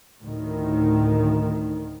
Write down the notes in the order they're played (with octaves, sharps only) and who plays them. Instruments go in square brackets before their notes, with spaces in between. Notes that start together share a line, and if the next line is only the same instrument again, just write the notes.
[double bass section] D2 A2 D#3